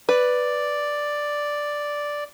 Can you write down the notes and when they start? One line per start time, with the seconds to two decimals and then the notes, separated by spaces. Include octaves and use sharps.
0.09 B4 D5